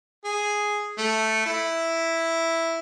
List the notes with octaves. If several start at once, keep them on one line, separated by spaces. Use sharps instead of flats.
G#4
A3
E4